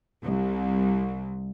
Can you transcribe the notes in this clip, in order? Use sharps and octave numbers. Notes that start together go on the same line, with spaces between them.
C2